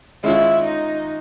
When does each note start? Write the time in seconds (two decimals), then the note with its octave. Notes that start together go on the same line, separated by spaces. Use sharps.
0.24 G#3 C#4 E4 F4
0.64 D#4